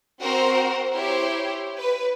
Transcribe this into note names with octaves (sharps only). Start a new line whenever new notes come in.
C4 F#4 A#4 C5
E4 G4 C5 C#5
B4